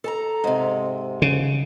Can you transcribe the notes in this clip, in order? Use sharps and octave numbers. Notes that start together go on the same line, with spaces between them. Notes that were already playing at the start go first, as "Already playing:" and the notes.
A4 A5 A#5
G#2 C3
C#3